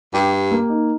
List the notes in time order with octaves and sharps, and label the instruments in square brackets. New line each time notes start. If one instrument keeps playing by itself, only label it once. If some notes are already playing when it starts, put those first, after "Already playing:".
[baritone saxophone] G2 [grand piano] G4
[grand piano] G4
A#3
D#4